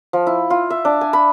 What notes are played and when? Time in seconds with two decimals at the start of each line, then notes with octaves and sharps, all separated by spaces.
0.13 F3
0.27 E4
0.50 F4
0.70 E5
0.85 D4
1.01 G#5
1.13 B5